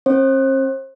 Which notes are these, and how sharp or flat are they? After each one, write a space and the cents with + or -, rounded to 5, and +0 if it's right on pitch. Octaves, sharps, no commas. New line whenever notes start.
C4 +45 C5 +35